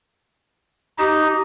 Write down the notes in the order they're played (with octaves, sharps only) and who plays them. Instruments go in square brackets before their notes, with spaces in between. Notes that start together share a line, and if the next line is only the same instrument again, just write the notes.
[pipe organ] D#4 [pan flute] G4